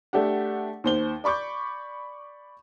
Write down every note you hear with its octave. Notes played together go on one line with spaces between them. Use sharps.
A3 D4 G4 F#5
D#2 C5 G7
D5 B5 C#6 D6 G6